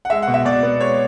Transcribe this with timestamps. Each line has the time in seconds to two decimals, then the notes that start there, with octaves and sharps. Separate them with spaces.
0.05 F#5
0.10 G#3 E5
0.22 F#5
0.28 B2
0.34 E5
0.45 B2 D5
0.63 B3
0.81 G#3 C#5